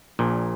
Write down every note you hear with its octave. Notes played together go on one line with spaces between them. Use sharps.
A#1 A#2